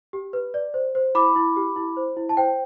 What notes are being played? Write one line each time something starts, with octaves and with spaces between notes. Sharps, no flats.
G4
B4
D5
C5
C5
E4 B5 D6
E4
G4
E4
C5
E4
A5
C5 G5